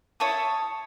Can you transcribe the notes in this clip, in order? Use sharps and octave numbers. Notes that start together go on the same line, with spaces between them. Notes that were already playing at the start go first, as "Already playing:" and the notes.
E4 C#5 A5 D#6